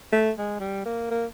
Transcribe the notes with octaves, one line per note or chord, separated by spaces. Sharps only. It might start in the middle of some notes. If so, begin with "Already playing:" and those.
A3
G#3
G3
A#3
A#3